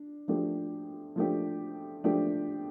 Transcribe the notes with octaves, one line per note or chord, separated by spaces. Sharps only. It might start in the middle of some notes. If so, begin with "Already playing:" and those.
Already playing: D4
F3 A3 D4 G4
F3 A3 D4 G4
F3 A3 D4 G4